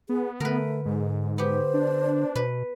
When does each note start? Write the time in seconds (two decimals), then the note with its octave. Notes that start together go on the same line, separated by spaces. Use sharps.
0.09 B3 G#4
0.40 D3 A3 A#4 B4
0.85 G#2 G#3
1.38 B3 G4 C5
1.74 D4
2.35 B2 B4